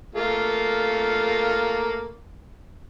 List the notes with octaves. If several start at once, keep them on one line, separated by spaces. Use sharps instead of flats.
A3 A#3 F4